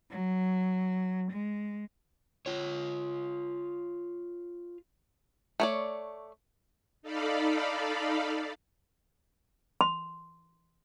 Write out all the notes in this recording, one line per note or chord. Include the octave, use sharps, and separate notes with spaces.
F#3
G#3
F4 C#5
A3 C#5 D5
D#4 A4 D5 F5 B5
C6